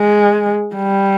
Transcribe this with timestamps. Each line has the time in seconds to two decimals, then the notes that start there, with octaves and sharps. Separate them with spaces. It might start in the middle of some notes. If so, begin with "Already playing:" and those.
Already playing: G#3
0.75 G3